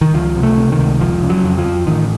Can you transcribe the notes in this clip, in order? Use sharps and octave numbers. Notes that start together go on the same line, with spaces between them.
D#3
C#2 F3
C3
A3
C3
D#3
C#2
F1 F3
C#3
F#3
F2
F3
F2
A1 D#3